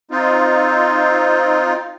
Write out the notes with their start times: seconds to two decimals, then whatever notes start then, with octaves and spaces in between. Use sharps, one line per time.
0.11 C4 D#4 F4